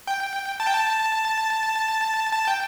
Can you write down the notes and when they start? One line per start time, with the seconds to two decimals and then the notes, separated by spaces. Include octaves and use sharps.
0.07 G5
0.60 A5
0.67 G5
0.74 A5
2.33 A5
2.48 G5